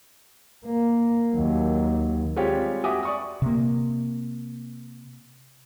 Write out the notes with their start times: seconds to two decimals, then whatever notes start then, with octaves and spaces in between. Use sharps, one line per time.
0.65 A#3
1.33 D#2 F#3
2.36 G3 G#3 C4 F4 G4 C#5
2.84 F#4 G4 E5 G#5 D6 D#6
3.03 D5 C#6 D#6
3.42 C3 A#3